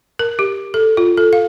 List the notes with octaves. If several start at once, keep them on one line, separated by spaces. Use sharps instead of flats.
A#4
G4
A4
F4
A4
F5